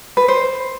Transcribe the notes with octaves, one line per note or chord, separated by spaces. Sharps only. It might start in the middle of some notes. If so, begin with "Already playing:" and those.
B4
C5